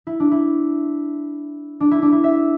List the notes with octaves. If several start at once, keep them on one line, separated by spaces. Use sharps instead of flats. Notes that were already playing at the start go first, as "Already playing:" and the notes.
E4
D4
E4
D4
E4
D4
E4
E5